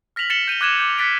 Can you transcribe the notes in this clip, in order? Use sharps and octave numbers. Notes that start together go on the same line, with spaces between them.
F6 A#6 B6 F7 F#7
A6 C#7 E7 F#7 G7
G6 D#7 F7 G7
D6 F#6 G#6 D#7 E7 G7
D6 G6
F6 F#6 A6 B6 C#7 D7